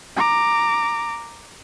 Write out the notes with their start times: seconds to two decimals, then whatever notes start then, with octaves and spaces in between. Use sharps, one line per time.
0.16 A#5 D6